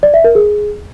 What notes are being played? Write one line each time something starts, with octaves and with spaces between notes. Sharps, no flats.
D5
E5
A#4
G#4